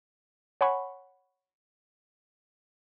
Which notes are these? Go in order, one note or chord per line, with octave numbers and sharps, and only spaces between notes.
C#5 F#5 G#5 B5 C#6